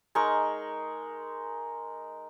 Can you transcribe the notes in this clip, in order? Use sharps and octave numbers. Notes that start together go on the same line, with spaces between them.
G#3 D#4 A#4 C#6